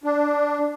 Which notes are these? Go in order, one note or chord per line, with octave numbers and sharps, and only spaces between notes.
D4